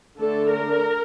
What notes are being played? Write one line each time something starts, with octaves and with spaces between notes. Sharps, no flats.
D3 A3 D4 A4
A#4